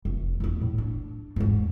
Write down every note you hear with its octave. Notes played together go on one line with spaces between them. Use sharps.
F1
E2 B3
A2
D4
E2 G#2